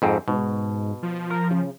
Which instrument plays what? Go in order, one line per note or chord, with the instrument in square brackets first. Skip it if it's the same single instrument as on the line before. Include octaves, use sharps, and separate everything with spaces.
[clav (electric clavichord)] F2 G#2 C4
[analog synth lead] G#2 [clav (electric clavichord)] B2
[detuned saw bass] F3
[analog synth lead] A#4
C#3